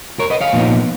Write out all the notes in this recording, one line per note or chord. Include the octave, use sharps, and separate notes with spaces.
A#4 C#5
B4 D#5
C#5 F5
A#2 F3 B3 D#4